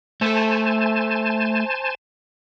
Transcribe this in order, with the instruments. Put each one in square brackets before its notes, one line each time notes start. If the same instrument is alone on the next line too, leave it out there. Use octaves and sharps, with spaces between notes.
[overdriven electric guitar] A3 A4 [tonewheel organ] C5 G#5 A5